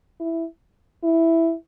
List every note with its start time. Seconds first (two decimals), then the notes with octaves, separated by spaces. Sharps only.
0.20 E4
1.03 E4